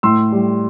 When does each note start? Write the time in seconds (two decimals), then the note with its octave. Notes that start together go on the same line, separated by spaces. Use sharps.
0.03 A2 C6 E6
0.32 G3